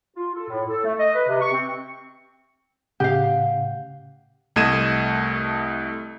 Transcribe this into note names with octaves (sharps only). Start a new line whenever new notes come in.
F4
A4
A2
A4
A3
D#5
B4
C3
C#6
C4
A2 C#3 G4 F5 F#5
C2 A3 D#5 G#6 D#7 E7